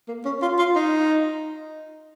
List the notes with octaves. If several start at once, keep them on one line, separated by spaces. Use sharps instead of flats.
A#3
C#4
F4
F4
D#4